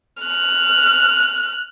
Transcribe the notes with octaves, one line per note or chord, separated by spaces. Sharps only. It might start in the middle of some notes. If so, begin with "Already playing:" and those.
F6 F#6